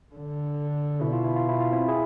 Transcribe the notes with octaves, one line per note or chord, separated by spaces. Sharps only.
D3
B2 E4
F4
E4
F4
E4
F4
C4 E4
E4 G#4